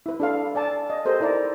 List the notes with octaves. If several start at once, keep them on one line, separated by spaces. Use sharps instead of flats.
E4 B4
D4 A4 F5
D5 G#5 A5
D#5
G4 A4 A#4 C5 D#5
D#4 E4 B4 D5 A#5